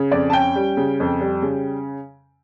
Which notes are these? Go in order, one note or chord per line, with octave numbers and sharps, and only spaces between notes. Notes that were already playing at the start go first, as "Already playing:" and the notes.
Already playing: C#3
F2 D5
A5
C#4 G5
G3
C#3
F2
G3
C#3